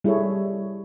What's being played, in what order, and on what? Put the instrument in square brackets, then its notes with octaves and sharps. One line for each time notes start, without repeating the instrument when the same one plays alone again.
[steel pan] G3 E4 G#4 A4 C#5